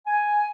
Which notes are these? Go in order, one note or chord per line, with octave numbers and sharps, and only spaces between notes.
G#5